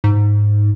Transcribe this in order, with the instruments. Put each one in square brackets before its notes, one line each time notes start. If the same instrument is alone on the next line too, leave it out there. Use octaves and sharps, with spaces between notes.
[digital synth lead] G#2